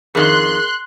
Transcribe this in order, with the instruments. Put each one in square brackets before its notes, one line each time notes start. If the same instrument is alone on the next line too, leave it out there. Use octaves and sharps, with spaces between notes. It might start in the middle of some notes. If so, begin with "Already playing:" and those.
[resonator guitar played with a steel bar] F2 D#3 [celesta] G#4 A#4 [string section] C6 F#6